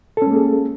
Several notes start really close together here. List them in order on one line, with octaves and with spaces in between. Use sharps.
A4 C#4 G#3 A#3 G#4